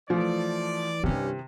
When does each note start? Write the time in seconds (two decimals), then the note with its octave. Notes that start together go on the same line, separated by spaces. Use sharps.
0.10 E3 F3 A3 D5
1.04 G2 C3 D#3 G3 C#4 E4